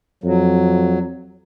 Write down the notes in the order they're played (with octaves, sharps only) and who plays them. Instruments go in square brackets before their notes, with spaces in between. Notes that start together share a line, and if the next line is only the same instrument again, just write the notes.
[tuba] F2 [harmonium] F#3